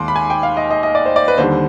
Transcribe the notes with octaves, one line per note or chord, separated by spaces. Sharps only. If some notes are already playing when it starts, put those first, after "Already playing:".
Already playing: D#2 D#3 G#3 C6 D6
B5
G#5
G5
F5
D#5
D#5
D#5
D5
C5
D5
B4
D#2 D3 G3 C5